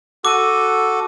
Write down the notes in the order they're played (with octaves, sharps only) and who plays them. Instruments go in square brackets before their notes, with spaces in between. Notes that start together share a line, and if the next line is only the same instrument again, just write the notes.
[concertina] F#4 A4 [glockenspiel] D6 D#7